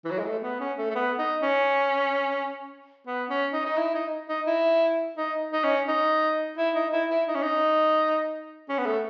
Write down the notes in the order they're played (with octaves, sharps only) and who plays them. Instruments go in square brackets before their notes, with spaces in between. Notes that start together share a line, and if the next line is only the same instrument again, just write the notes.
[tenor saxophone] E3
F#3
G#3
A3
B3
C#4
A3
A3
B3
D#4
C#4
B3
C#4
D#4
D#4
E4
D#4
D#4
E4
D#4
D#4
C#4
D#4
E4
D#4
E4
E4
D#4
C#4
D#4
C#4
B3
A3